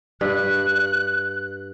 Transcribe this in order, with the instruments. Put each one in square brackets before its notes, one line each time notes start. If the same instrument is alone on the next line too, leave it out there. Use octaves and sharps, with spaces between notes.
[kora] G2 [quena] F#6